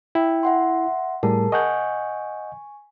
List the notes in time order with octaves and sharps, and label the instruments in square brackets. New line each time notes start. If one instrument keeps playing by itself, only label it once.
[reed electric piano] E4 [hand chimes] G5
[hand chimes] E5 F#5 C6
[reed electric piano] A2 G3 [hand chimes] G#4 A#4 A5
[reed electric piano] D#5 F#5 G6 [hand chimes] G#5 C#6